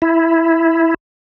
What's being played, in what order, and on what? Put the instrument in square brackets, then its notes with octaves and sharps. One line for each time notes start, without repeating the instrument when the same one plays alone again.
[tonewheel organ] E4